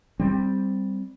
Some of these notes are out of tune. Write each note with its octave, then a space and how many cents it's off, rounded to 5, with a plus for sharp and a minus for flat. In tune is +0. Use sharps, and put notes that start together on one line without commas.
G3 +0 C4 +0